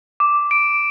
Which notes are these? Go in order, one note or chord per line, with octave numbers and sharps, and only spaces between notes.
D6
D7